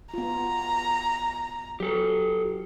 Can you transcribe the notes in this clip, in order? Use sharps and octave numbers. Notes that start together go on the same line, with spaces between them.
B3 F4 A#5
F#3 G4 A4